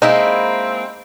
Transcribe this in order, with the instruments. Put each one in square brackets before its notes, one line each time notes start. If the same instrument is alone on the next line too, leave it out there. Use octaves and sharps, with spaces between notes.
[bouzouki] G#3 A#3 E4 [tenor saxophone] C4 [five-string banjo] D#4